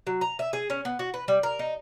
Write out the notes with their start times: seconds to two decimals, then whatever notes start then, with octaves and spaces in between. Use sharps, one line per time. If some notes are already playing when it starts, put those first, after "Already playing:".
0.07 F#3
0.21 A#5
0.39 E5
0.53 G#4
0.70 C#4
0.85 B3
0.99 F#4
1.14 B4
1.28 G3
1.43 A#4
1.59 D#4